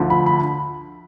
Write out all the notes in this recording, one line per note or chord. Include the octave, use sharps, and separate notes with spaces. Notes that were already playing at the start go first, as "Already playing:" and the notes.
Already playing: D2 D3 F3
B5
B5